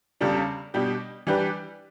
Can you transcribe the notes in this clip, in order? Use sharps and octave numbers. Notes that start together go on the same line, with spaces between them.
E2 C#3 G3 D4 A4
B2 G3 D4 G4
E3 G3 D4 G4 B4